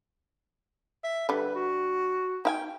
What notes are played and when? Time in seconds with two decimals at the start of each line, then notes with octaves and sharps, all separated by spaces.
1.04 E5
1.29 D3 G3 B4
1.55 F#4
2.45 D#4 F5 G5 G#5